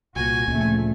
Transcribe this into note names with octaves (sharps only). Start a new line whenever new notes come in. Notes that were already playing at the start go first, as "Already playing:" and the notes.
C2 A#2 F#4 G#5
D2 A#2 C#3 F3 A3